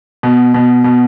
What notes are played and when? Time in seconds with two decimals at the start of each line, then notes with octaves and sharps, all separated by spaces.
0.23 B2
0.54 B2
0.84 B2